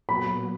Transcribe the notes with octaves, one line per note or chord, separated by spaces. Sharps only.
A#2 F#3 B3 B5